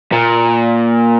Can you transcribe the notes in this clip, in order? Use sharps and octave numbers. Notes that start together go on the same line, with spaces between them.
A#2